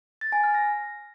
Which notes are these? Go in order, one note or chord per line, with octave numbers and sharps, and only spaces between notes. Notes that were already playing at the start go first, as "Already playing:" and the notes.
A6
G#5
F6
A#6